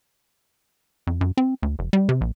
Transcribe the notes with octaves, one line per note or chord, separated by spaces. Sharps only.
F2
F#2
C4
D2
F1
G3
C3
A#1